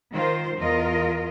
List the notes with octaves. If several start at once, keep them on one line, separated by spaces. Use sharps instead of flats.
D#3 F4 A#4 C5
E2 F4 A#4 D#5